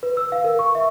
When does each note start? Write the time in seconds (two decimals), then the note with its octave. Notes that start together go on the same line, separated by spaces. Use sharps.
0.03 B4
0.17 E6
0.32 F5
0.44 A#4
0.59 C#6
0.75 E5